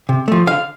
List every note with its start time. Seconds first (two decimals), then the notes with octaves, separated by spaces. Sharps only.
0.09 C3
0.28 F3 A3
0.47 D3 F5